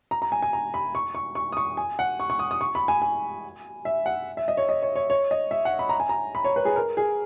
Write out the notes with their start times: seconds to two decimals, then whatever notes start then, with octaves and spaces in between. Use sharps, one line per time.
0.11 A#5
0.22 A#5
0.32 G#5
0.42 G#5
0.53 A#5
0.74 B5
0.95 C#6
1.15 C#6
1.35 C#6
1.52 D#6
1.57 C#6
1.77 G#5
1.99 F#5
2.20 C#6
2.30 C#6
2.39 D#6
2.51 D#6
2.61 C#6
2.75 B5
2.88 G#5
3.02 G#5
3.85 E5
4.06 F#5
4.37 E5
4.48 D#5
4.57 C#5
4.69 D#5
4.82 C#5
4.96 C#5
5.10 C#5
5.31 D#5
5.51 E5
5.65 F#5
5.79 B5
5.89 A#5
6.00 G#5
6.09 A#5
6.35 B5
6.44 C#5
6.56 B4
6.65 G#4
6.76 A#4
6.97 G#4